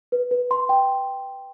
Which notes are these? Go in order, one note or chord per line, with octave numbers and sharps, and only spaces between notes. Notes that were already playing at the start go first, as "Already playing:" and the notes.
B4
B4
C6
G5